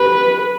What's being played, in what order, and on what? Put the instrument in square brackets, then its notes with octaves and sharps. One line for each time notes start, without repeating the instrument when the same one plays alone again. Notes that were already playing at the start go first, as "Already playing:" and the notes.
Already playing: [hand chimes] G4 [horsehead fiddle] B4